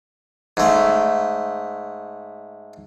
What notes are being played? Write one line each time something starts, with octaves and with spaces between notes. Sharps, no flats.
G#2 A3